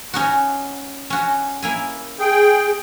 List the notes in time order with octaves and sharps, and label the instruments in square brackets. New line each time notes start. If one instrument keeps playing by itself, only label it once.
[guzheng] C#4 D#4 F#4
C#4 F#4
A#3 E4 G#5
[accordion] G#4 G5